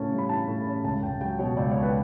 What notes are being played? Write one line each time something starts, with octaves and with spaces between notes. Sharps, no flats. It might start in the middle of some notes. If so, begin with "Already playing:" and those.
Already playing: A2 C#3 C#4 A5
G3
B5
E3 A5
A2
C#4
C#2 A5
C#2 G5
F#3 G5
B2 C#5
C#2 D5
C#2 C#5
B4